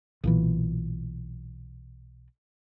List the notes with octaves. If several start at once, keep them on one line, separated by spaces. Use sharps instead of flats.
B1 A#2 E3